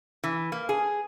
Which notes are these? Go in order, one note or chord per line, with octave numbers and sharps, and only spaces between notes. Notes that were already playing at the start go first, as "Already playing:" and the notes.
E3
A#3
G#4